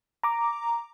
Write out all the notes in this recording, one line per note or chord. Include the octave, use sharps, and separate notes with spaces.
A#5 D6